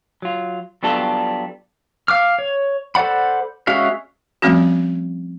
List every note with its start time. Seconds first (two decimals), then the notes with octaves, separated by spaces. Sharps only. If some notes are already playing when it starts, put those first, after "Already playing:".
0.22 F#3 F4
0.83 F#3 G3 B3 D4 F4 A4
2.08 F5 D6 F6
2.39 C#5
2.95 A4 C5 D5 F#5 B5
3.67 G#3 C#4 F#4 E5 F5
4.42 F3 G3 A3 C4 C#4 F#4